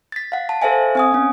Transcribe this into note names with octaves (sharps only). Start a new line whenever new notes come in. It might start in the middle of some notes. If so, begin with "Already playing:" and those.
A6 B6
F5 F#5
A5
A4 C5 E5 F5 G#5
C4 G#5 D#6
B3 C#4